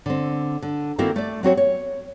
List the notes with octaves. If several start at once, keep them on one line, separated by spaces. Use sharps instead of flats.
D3 C4
D3
D#3 A#3 C4 E4 F#4 A4
A3 D5
F#3 C4 F#4 C#5
C#5